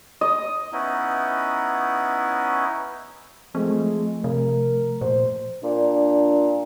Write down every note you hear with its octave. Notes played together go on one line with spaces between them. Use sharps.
D#5
B3 C#4 D#4 E4
F3 G#3 A3 C4
C3 A#4
A#2 C5
A#2 D4